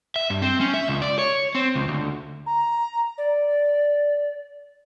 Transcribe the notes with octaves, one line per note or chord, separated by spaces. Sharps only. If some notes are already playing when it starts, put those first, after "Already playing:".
E5
G2
C4
C#4
E5
C#2
D5
C#5
C4
C#2
D2
A#5
D5